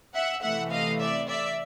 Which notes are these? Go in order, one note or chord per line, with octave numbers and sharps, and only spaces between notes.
E5 F#5
C3 E3 A3 E5 F#5
D#5 F5
D5 E5
D5 E5